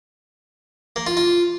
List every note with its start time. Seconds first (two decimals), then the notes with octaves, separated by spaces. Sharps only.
0.96 A#3
1.07 F4
1.17 F4